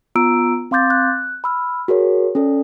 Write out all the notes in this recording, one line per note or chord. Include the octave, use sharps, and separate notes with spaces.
B3 F4 A#5 E6 D7
C4 F5 C6 D6 G6 A6
F#6
B5 E6 F6
F#4 G#4 A#4 C#5
C#4 A4 D5